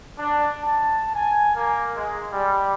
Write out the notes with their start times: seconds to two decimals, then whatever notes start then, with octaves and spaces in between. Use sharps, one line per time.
0.18 D4
0.63 A5
1.14 G#5
1.55 A#3
1.95 G#3
2.33 G3